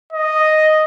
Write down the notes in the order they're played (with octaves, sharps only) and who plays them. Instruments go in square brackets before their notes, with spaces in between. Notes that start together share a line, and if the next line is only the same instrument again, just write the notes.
[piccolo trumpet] D#5